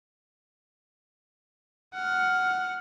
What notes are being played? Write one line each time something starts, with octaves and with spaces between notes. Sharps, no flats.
F#5 F6